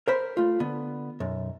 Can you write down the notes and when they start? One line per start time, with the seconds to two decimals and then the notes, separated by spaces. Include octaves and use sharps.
0.08 A#4 C5 B5 C6
0.37 A3 F4
0.60 D3 B3
1.20 B1 F#2